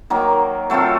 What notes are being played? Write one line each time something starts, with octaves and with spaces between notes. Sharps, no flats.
D#3 F#3 A#3
F#3 A3 C4 F4